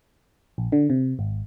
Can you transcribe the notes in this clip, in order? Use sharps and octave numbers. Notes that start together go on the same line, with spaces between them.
A#1
D3
C3
G#1